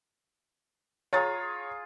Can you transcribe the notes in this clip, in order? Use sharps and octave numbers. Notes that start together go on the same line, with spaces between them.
F4 G#4 C#5 A#5 A6